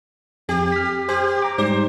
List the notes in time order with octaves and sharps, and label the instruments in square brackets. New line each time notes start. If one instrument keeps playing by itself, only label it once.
[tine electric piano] F2 [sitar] G4
[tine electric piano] F6 B6
[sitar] G4 [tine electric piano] C5
[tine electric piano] A#5 D6
[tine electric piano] G#2 G3 [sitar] C5